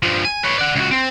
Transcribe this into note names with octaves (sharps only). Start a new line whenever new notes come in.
G2 F3
G#5
B4 C#5
D5 F#5
C#2 F#4
C4